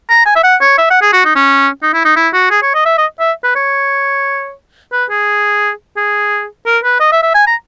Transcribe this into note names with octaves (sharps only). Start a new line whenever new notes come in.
A#5
G#5
E5
F#5
C#5
E5
F#5
G#4
F#4
D#4
C#4
D#4
E4
D#4
E4
F#4
G#4
C#5
D#5
E5
D#5
E5
B4
C#5
B4
G#4
G#4
A#4
B4
D#5
E5
E5
G#5
A#5